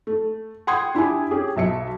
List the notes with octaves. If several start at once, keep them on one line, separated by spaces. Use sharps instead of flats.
A3
F#5 G5 C6 D#6 G#6
D4 E4 G4 G#5
C#4 G4 G#4
B1 E5 C#7